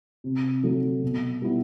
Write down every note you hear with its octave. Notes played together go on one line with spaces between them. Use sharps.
C3
F#3 A3
B2
G3 B3 E4